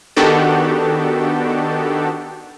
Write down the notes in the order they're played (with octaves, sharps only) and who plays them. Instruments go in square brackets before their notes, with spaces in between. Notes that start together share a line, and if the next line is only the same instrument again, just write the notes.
[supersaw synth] D#3 B3 D4 F#4 G4 A4